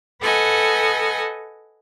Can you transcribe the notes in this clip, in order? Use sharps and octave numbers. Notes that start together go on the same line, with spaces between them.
A4 B4 D#5 F#5 G#5